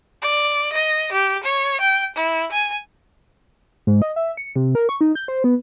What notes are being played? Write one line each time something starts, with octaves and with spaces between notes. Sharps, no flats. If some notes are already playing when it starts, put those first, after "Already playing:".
D5
D#5
G4
C#5
G5
E4
G#5
G#2
D#5
E5
C#7
C3
A#4
C#6
D#4
G6
C5
B3